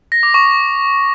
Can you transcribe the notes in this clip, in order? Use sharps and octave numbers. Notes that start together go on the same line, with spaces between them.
A#6
D6
C#6